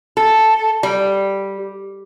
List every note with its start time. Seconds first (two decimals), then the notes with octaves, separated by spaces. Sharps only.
0.17 A4
0.83 G3